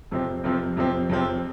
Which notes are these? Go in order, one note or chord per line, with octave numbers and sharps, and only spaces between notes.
F2 C3 F3 C4
F2 C3 F3 C4
F2 C3 F3 C4
F2 C3 F3 C4